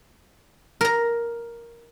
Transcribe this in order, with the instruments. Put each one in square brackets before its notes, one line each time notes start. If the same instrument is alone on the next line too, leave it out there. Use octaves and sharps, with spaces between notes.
[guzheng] A#4 A#5